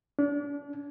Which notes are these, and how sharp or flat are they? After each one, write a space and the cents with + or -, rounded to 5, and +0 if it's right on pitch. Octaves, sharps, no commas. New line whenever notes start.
D4 -35